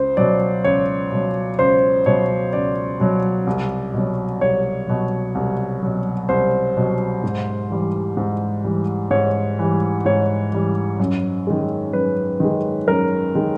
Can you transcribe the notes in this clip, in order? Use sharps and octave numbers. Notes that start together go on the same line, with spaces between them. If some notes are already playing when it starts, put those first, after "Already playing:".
Already playing: C#2 C5
B2 F#3 D5
C#2 C#5
B2 F#3
C#2 C5
B2 F#3 C#5
C#2 D5
B2 F#3
C2
B2 F#3
C2 C#5
B2 F#3
C2
B2 F#3
C2 C5
B2 F#3
G#2
E3 G3
G#2
E3 G3
G#2 C#5
E3 G3
G#2 C#5
E3 G3
F#2
D#3 G#3
F#2 B4
D#3 G#3
F#2 A#4
D#3 G#3